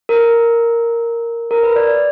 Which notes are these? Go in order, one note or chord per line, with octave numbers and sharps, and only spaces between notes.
A#4
A#4
B4
D5